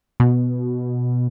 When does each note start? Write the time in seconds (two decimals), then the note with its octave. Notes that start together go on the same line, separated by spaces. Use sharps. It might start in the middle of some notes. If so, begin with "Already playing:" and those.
0.20 B2